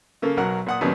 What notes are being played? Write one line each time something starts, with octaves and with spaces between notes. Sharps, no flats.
C#3 A#3 A4
B1 F#3 A#4 F#5
A#2 F#5 D#6
D#2 A#2 C#3 F#3 B3